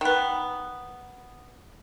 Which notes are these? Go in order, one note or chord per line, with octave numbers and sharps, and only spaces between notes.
D#3 B3